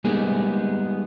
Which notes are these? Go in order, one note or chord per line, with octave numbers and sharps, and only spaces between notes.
G3 G#3 A#3 B3 D#4 G#4